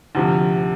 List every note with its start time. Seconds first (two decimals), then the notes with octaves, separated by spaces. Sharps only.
0.15 D2 C3 F3